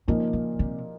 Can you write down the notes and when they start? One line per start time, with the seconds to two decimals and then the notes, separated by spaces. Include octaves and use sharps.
0.08 A#2 C#3 F3 A#3 D#4
0.33 C#3
0.59 C3